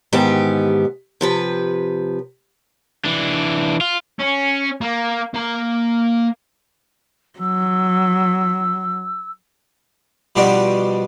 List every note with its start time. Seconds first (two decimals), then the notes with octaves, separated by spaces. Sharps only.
0.13 G#2 D#3 E3 B3 G4
1.21 C3 F3 B4
3.05 E3 D4
3.81 F4
4.19 C#4
4.81 A#3
5.34 A#3 A#5
7.39 F#3 E6
10.36 B2 F3 G3 D4 F#4